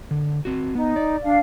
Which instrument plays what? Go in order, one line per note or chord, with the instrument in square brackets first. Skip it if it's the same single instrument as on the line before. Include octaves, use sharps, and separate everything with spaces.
[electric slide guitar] D3
C4 F#4
[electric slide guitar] B3 [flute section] D#4
[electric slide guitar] D5
[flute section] D4 F5